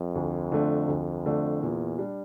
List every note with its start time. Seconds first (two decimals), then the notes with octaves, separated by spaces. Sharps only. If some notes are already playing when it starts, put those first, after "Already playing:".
Already playing: F2
0.15 D2
0.52 D3 A3 D4
0.88 D2
1.26 D3 A3 D4
1.62 E2 A#2
1.98 G3 D4